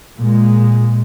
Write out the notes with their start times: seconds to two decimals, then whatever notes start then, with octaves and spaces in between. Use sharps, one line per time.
0.18 A#2 G#3